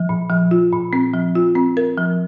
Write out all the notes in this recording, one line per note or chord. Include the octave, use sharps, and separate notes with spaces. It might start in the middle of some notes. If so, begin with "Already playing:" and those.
Already playing: F3
A#2
F3
F4
A#2
C4
F3
F4
C4
A#4
F3